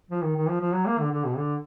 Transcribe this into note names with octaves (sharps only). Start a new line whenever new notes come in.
F3
D#3
D#3
F3
F3
F#3
A#3
D3
D3
B2
D3